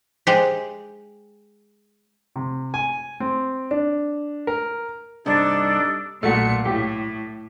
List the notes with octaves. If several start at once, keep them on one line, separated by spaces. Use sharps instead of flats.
G#3 G4 C5
C3
G#5
C4
D4
A#4
G2 C3 D4 D#4 G4 A4
B1 A#2 A3 F#4 C#7
A2 G4